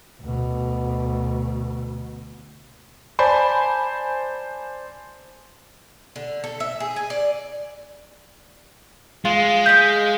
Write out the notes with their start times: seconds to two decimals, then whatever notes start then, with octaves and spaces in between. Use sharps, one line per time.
0.21 D2 B2
3.19 C5 D5 G#5 A5 B5
6.16 D3
6.44 A4
6.60 E5
6.80 G#4
6.96 G#5
7.10 D5
9.25 G#3 F4
9.66 D#5 F5 G6 B6